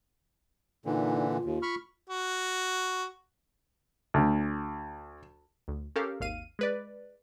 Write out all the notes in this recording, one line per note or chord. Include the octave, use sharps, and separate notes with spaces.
A#2 D3 E3 D#4
F4
D#2
B5 C#6 F6
F#4
D2
D2
C#4 G4 A4 A#4 F5
G#1 D#2 F5 D#7
G#3 B4 D5